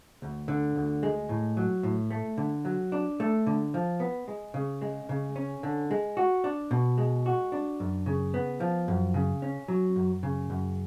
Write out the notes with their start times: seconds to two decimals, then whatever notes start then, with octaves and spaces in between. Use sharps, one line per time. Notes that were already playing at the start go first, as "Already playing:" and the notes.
0.22 D2
0.48 D3
0.76 D2
1.03 G#3
1.29 A2
1.57 F#3
1.83 A2
2.10 A3
2.38 D3
2.65 F#3
2.92 D4
3.20 A3
3.47 D3
3.74 F3
4.00 B3
4.28 G#3
4.54 C#3
4.82 G#3
5.09 C#3
5.36 C#4
5.63 D3
5.91 G#3
6.17 F#4
6.44 D4
6.71 B2
6.98 G#3
7.26 F#4
7.52 D4
7.80 F#2
8.06 C#3
8.34 B3
8.60 F3
8.88 F#2
9.14 C#3
9.42 C#4
9.68 F#3
9.96 F#2
10.23 C#3
10.50 F#2